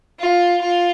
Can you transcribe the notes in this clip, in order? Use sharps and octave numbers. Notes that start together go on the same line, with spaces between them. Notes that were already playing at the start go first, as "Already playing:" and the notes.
F4
F4